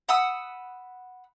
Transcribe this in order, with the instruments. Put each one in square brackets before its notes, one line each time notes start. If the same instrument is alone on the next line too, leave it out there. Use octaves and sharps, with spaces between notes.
[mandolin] F#5 B5 D#6 E6